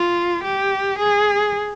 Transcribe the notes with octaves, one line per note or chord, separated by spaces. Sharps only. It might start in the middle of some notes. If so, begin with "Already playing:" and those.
Already playing: F4
G4
G#4